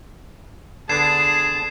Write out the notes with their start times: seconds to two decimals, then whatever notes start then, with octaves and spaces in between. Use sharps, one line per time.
0.89 D3 B3 D4 G#4 A5 G#6 C7 E7